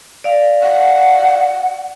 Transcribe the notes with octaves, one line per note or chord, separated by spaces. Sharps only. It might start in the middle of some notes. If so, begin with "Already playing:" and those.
D5 F5
F#5